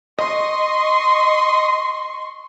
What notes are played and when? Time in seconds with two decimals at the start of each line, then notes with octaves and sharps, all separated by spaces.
0.19 D#5 C6 C#6